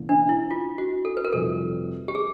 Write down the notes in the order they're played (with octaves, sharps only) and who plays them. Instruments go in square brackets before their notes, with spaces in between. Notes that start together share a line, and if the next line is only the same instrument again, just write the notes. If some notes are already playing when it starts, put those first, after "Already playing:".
Already playing: [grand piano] E1 E2 C#3 A#3
[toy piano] D4
E4
F4
F#4
A4
B4
A#4
[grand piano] F1 F2 C3 D#3 G3 [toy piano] A4
[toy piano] G4
G#4